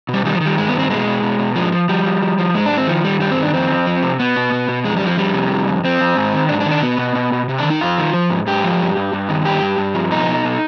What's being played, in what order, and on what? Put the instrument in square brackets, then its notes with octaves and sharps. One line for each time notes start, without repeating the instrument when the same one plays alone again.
[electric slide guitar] B2 G3
D#3 G3
F3
D#3
G3
G2 G#3
D#3 B3
C4
B2 G#3
B2
B2
B2
G#2 F3
F3
F3 G3
F3
F3
F3
G#2 G#3
D4
G#2
C4
D#3 F3
D#3 G3
G2 G3
C4
D#3
D4
F2 C4
F2
F3
C3
B2 B3
B2
B2
B2
F2 G#3
G3
F2 F3
F2 G3
C3
F2
F2
F2 C4
F2
G#2
D#3
G#2 D4
D4
D#3
D4
B2 B3
B2
B2
B2
C3
D4
D#3
D#4
F2 F4
D#3
F3
G#2
G#2 G4
F3
G2
G2
G2
D#3
G2 G4
G2
G2
F3
B2 D#4
B2
B2